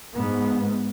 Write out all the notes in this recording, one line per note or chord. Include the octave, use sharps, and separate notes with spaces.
G#2 B3